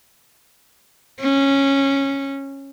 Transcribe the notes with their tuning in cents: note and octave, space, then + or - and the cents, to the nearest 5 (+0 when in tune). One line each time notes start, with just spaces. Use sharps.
C#4 -10